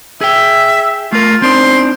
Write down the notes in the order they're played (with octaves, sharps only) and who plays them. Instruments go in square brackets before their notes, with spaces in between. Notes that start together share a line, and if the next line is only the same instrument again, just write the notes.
[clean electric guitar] G#4 G5 [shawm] E5
[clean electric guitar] A3 A#4 [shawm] F4
[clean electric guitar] C4 D4 D#4 [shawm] C5